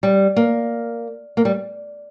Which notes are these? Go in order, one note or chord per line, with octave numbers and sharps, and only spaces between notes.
G3
A#3
A#3
G3